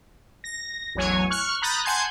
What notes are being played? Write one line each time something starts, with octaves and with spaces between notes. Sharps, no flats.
A#6
A1 E2 F#3 C#5 G#5
C#6 F6 F#6
A#5 B5 D#6 F#6 G6 A6
F#5 G#5 A5 C6 G6 G#6